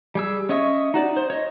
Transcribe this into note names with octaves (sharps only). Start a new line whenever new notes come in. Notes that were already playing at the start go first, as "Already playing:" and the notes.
G3 G#4 E6
C#4 C#5 D#5 E5 C#6
D#4 F#4 D5
C5
C#5 D#5